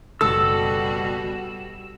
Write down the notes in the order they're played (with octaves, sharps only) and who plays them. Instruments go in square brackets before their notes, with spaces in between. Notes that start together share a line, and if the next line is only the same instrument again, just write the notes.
[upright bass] F#1 C#4 [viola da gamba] B2 G3 F#4 [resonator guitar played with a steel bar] A4 [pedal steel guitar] E6